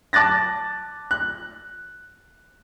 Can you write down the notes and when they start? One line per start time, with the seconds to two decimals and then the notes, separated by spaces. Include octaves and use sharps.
0.13 A5 D6 F#6 A6 A#6
1.11 F#6